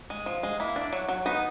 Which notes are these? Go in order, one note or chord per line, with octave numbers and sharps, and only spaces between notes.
G#3
F3
G#3
A#3 E4
D4
F#3
F#3
B3 D#4